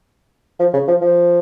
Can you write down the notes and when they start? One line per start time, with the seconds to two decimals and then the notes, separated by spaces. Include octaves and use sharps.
0.59 F3
0.74 C#3
0.88 F3
1.01 F3